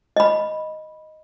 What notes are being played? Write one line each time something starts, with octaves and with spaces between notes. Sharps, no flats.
D#5 B5